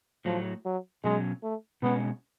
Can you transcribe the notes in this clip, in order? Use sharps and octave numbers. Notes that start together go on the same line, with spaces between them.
A2 F3 F#3 A3
F#3
B2 F#3 G#3 C#4
A3
B2 G#3 B3 C#4